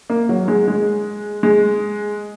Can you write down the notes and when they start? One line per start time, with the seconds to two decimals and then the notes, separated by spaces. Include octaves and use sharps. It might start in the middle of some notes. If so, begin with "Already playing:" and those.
0.10 A#3
0.29 F#3
0.48 G#3
0.68 G#3
1.43 G#3